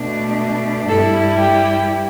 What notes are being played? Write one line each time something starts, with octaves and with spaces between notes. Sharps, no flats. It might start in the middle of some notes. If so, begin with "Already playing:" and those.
Already playing: B2 A3 D4
G2 G3 E4 A4
G4